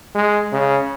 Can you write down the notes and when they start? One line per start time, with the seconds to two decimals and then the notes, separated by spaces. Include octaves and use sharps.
0.15 G#3
0.52 C#3